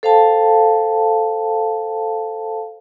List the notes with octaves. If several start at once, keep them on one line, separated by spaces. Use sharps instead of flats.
A4 C5 F5 G5 A5